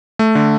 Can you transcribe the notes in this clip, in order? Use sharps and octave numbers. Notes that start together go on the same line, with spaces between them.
A3
D3